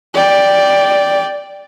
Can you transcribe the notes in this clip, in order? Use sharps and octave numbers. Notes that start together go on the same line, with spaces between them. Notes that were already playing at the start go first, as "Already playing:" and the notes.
D5 G5